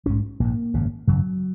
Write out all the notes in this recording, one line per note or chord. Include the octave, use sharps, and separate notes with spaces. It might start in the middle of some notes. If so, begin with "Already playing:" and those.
A#1 G#2 C#4
A#1 G#2 A#3
G#1 F#2 C#3
G#1 F#2 C#3 F#3